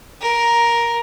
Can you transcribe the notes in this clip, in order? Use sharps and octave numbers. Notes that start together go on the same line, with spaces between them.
A#4